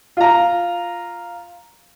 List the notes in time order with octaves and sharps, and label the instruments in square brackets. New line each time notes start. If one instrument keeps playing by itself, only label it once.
[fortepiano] F4 A#5